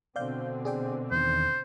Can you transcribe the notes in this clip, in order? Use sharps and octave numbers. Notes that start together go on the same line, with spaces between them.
B2 D3 C4 D5 F5 G6
G#4 D5 G5
E2 D#3 C5